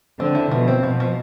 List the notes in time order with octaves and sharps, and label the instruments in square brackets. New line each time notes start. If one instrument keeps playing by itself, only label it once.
[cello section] D3 [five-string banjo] C4
[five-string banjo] E4
[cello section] B2 [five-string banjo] F3
[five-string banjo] C4
[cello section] B2 [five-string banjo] F3
[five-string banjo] F3